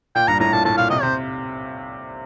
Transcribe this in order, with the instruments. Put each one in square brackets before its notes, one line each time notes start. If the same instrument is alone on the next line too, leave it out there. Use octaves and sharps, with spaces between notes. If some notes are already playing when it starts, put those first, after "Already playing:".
[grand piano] A#2 [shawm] G5
[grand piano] G2 [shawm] A#5
[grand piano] A2 [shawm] A#5
[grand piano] A#2 [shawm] A5
[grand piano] A2 [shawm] A5
[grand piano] A#2 [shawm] F5
[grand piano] C3 [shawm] D#5
[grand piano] C3 [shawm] C5